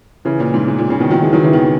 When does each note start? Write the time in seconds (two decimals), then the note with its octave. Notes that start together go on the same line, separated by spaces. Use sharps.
0.25 C#3 E3
0.40 A#2
0.54 G#2
0.68 G#2
0.78 A#2
0.90 A#2 C#3
1.00 B2 D#3
1.10 D#3 F#3
1.22 E3 G#3
1.33 D#3 F#3
1.43 C#3 E3
1.53 B2 D#3